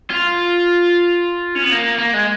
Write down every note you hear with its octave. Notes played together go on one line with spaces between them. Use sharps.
F4
C#4
B3
A#3
A#3
G#3